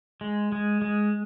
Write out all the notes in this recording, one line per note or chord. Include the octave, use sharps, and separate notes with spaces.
G#3
G#3
G#3